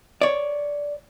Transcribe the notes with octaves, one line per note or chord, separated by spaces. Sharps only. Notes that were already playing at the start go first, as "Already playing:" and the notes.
C#5 D5